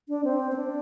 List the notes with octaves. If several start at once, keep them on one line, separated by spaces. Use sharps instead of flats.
D4
C4
C4
D4